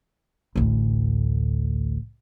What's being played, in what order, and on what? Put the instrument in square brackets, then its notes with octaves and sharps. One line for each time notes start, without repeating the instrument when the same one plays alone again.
[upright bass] A1 D2